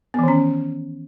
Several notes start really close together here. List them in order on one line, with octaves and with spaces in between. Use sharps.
B3 E3 D#3 C#4